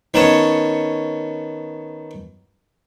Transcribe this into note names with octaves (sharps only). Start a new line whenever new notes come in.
D#3 B3 C#4 C#5 A5